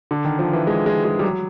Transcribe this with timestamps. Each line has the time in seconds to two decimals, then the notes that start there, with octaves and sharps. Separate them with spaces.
0.11 D3
0.25 D#3
0.39 F3
0.53 E3
0.67 G#3
0.86 G#3
1.05 G#3
1.19 G3
1.24 F#3